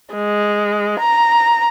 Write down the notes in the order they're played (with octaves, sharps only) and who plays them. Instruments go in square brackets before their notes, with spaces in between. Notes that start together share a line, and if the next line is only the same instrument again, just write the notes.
[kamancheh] G#3
A#5